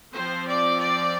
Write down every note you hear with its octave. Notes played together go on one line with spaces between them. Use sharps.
F3 C4 C5
D5
D5